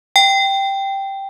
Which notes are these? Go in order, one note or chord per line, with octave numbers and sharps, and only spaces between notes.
G5